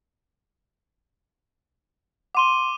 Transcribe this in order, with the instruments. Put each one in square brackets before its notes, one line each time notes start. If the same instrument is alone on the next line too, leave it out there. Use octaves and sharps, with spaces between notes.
[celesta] F#5 C6 [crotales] D6 D#7 G7